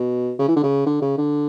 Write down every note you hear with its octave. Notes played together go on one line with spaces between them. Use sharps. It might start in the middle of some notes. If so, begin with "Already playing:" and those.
Already playing: B2
C#3
E3
D3
C#3
D3
C#3
D3